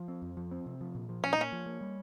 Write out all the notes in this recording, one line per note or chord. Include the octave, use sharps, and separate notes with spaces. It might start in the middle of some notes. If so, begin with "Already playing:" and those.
Already playing: F3
C4
F2
F3
C4
C3
F3
A#2
F3
A#2 C#4
D#4
A#3 C#4
F3
A#3
G3